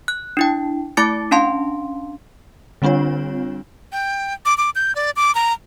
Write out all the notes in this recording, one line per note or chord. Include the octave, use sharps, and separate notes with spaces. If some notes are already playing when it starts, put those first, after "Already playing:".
F#6
D4 E4 G5
A3 E4 A5 D6 A6 C#7
C#4 D4 F5 A5 C6
D3 G3 C4 D4 F4 C#5
G5
D6
D6
G6
D5
D6
A#5